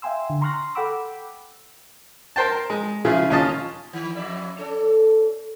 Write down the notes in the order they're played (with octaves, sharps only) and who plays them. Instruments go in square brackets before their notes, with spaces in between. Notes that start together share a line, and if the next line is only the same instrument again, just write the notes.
[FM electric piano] E5 F5 G5 G#5 C6 E6
D3
A#5 C6 C#6 F6 F#6 A#6
A4 F#5 G5 B5 D6 E6
[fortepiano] A#4 C5 G5 A5
G#3
C#3 F3 C#4 E4 F4 G#4
D#2 C#4 F4 D#5 A5
[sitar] D#3
F2 D5 E5
C#4 A4